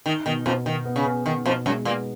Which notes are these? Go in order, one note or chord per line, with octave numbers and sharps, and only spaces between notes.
D#3 D#4
B2 D#3
F2 B2 F3
B2 D#3
B3
C#3
B3
D#3 B3
F2 B2 F3
F#2 F#3 G#3
A#2 A#3 B3